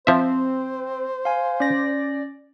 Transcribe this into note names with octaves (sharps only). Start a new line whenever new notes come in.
F3 C4 C5 E5
F5 G#5
C#4 D5 A#6